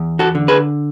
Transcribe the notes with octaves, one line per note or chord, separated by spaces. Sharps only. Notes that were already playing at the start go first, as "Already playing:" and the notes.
Already playing: E2
F#4 A4
D3
G#4 B4